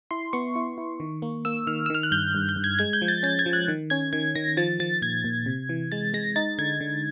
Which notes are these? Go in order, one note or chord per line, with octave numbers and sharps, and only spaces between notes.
E4 C6
B3 C#6
E4
E4
D#3
A#3
A#3 E6
D#3 F6
E6
D#3 F6
F#6
G2 G6
G2
G6
G2
G#6
G#3 G#6
G6
F3
A6
C#4 A6
G#6
F3
F#6
D#3
C#4 G#6
D#3 G#6
D#3 A#6
F3 A6
F3 A6
A#2 G#6
A#2
C3
E3
G#3 A6
G#3 A#6
D#4 A6
D3 G#6
D3